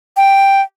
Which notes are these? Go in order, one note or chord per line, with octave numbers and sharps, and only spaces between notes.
G5